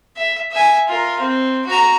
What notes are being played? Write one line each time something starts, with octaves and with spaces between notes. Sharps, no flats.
E5
E5 G#5
F4 A#4
C4
F#4 A#5